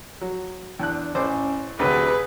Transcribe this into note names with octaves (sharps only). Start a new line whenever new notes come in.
F#3
E2 D4 F#6
A1 C#4 C5 D6
D2 C3 F#3 G#4 B4